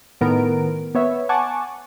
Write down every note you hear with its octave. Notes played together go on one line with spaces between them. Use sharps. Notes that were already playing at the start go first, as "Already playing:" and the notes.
A2 D#3 B3 A#4 D7
B3 C#5 E5
F#5 G#5 A5 C#6 D6